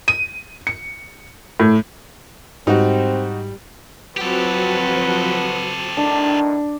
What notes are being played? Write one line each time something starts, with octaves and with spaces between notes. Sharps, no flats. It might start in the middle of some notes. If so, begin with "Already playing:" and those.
D#7
C#7
A2
G#2 G3 C4 D#4 F#4
F3 F#3 C4 F#4 G4 A4 B4
A2 D#3 D4